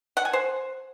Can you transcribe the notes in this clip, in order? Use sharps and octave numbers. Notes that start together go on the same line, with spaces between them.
F#5
G#5
C5